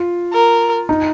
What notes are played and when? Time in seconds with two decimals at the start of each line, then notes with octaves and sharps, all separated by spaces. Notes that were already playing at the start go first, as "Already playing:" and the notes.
Already playing: F4
0.33 A#4
0.89 D#4